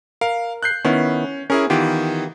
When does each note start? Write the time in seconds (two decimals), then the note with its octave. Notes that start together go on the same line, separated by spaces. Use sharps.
0.21 A#4 F5
0.63 F#6 G6 C7
0.85 D#3 B3 C#4 E4
1.50 C#4 E4 G#4 A#4
1.70 D#3 E3 B3 F4 G4